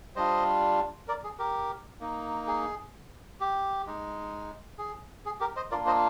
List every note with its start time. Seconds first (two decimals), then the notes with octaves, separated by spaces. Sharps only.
0.16 G3 D4 F4 C5 D#5
1.08 A#4 D5
1.24 G#4
1.39 G4 A#4
2.00 A#3 D#4
2.47 G#4
3.40 G4
3.87 G#3 D#4
4.78 G#4
5.26 G#4
5.40 G4 A#4
5.56 C5 D#5
5.71 A#3 D4 F4 A#4 D5
5.86 C5 D#5